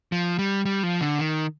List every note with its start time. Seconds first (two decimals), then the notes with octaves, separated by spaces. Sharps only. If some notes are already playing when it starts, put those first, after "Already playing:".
0.12 F3
0.39 G3
0.65 G3
0.83 F3
1.01 D3
1.19 D#3